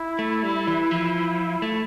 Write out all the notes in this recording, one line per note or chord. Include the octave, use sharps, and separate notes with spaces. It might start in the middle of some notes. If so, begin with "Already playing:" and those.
Already playing: E4
A3
G3
E3
F3
A3